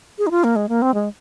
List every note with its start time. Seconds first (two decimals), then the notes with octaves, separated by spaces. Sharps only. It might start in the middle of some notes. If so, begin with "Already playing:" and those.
0.19 G#4
0.27 D#4
0.31 F4
0.44 A#3
0.56 G#3
0.69 A#3
0.82 C4
0.94 G#3